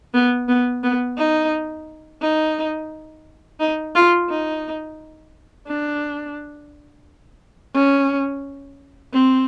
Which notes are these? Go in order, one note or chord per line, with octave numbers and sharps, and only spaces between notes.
B3
B3
B3
D#4
D#4
D#4
F4
D#4
D4
C#4
C4